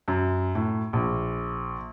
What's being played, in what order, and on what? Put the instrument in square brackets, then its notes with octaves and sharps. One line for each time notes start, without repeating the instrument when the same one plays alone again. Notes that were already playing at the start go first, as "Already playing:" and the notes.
[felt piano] F#2
A2
A#1